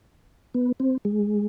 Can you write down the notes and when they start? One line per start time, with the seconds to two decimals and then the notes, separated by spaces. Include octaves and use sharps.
0.54 B3
0.80 C4
1.05 G#3